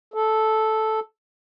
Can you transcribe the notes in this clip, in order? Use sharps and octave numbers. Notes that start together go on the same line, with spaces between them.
A4